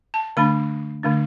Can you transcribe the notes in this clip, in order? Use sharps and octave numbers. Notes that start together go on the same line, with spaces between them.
A5
D3 A3 D4 B5
D3 A3 D4